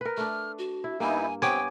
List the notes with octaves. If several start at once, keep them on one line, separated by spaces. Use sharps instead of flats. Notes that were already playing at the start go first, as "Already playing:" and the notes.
A#4 B4
A3 D4 F6
F#4
E4
G2 A#3 B3 D#4 E4 G#5
F3 B3 C4 G4 C#5 G5 G#5 D6